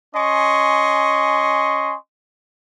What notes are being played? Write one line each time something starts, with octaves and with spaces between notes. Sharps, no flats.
C#4 D#5 G#5 C6 C#6